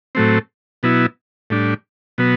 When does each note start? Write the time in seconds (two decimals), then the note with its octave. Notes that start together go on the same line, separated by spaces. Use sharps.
0.15 A2 F#3 A3 C4
0.83 B2 F#3 B3 E4
1.50 A2 G3 D4
2.18 B2 F#3 B3